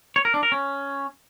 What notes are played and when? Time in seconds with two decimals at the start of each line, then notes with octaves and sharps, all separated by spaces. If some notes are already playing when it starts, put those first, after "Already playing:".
0.16 C#5
0.25 A#4
0.34 D4
0.43 A#4
0.52 C#4